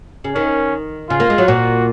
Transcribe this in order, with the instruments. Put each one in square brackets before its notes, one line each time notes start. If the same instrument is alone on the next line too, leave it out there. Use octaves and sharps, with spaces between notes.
[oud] C#3
[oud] D#3 [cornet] C#4
[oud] C#3 [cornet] F4
[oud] A#3
G#3
F#3
[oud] A#2 [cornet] F#4